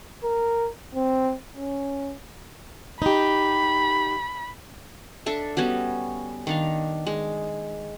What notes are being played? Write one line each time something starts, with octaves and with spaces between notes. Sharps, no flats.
A#4
C4
C#4
D#4 G4 B5
D4 A4 E5
G3 B3 C#4 F#4
D#3 D4 F5
G#3